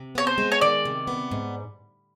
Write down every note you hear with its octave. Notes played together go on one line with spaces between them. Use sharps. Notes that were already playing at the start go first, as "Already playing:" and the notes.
Already playing: C3
B3 C#5
C5
G#3
C#5
D#3 D5
C3
B3
G#2